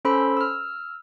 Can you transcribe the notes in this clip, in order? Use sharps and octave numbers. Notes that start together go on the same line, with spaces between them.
C#4 A4 C5 B5 C6 E6
E6 F6